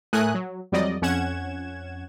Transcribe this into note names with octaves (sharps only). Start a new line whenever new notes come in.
A2 A3 A#4 G#5 D#6 F#6
F#3
F2 F#3 G3 D5 D#5
F2 C#4 F#5 G#6 E7